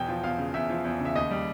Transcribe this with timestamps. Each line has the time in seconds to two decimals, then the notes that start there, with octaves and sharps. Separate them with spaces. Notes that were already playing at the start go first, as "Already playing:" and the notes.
Already playing: E2 B2 G5
0.08 F3
0.23 E2 F5
0.39 C#3
0.54 E2 E5
0.70 F3
0.85 E2
1.00 C#3 E5
1.16 D#2 D#5
1.31 G3